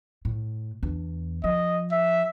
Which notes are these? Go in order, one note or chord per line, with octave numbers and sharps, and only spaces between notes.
A2
E2 D4
F3 D#5
E5